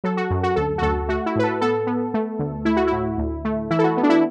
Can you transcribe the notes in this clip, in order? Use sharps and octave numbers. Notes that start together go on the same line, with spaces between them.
F#3 A4
F#4
F#2
F#4
D2 A4
F#4
D2 A4
A3 F#4
E4
A2 B4
A4
B3 A4
B3
A3
D2
A3 E4
F#4
A2 E4
D2
A3
E3 E4
A4
F#4
B3
D4
E4